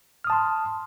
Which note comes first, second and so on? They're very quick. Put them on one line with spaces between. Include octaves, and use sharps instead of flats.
F6 D#6 A5 C6